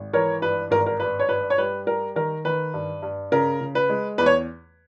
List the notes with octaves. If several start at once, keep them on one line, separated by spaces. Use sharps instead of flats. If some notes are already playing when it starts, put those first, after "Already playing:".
Already playing: G#1
E3 A#4 C#5
G2 B4
G#1 A#4
A#4
G2 B4
C#5
G2 B4
C#5
G3 B4
G3 A#4
D#3 A#4
D#3 B4
G2
G2
C#3 A#4
C#3
B4
G#3
E2 B4
C#5